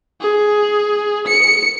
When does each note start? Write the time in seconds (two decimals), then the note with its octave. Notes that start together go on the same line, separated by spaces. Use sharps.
0.21 G#4
1.27 C#7